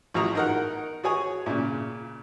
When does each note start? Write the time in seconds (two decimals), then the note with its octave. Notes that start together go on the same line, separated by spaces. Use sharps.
0.14 A1 F3 F#4 G#4 A#5
0.35 D#4 A#4 F#5
1.04 F#4 G#4 C#5 G#5
1.46 A#2 C#3